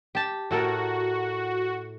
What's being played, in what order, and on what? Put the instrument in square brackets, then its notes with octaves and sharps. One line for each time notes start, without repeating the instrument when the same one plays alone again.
[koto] G4 A5
[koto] A2 A4 A#4 [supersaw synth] F#4